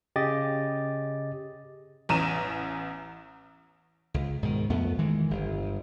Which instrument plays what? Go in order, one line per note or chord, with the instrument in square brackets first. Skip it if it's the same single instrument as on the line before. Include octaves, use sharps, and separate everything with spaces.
[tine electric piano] C#3 G4 D#5 A6
[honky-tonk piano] A1 E2 A#5 D#7 E7
[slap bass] C#2
G#2 B2 D#3
F2 A3 B3
D#3 E3 G#3
G1